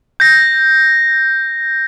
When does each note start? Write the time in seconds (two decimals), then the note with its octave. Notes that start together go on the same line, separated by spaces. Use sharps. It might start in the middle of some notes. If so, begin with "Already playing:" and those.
0.20 G6 A#6